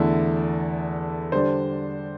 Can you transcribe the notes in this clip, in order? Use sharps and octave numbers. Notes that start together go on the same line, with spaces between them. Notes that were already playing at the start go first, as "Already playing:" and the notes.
Already playing: E2 D3 A3 E4 A5
D3 G3 D4 C5